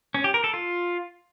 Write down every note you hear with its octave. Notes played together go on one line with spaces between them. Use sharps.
C#4
G4
A#4
A4
F4